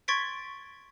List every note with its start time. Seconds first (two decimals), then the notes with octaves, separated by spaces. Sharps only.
0.08 C6 C#6 G#6 A6 B6 D7